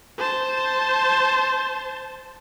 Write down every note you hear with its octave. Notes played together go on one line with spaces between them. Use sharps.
C5 A5